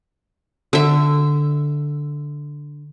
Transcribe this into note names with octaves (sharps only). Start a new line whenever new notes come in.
D3 E5